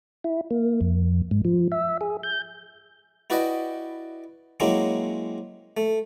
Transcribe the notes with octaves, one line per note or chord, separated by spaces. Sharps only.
E4
A#3
F2
G#2
F3
E5
G#4
G6
E4 F#4 B4 D5 D#5 G5
F#3 G#3 A#3 C4 C#4 E4
A3